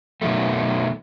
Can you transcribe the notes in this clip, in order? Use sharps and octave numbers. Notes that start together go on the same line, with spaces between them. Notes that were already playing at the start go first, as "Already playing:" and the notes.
B2 D#3 F#3 G3 A3